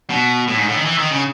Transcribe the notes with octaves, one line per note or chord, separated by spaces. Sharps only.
B2
A2
G#2
A2
D#3
E3
D#3
C#3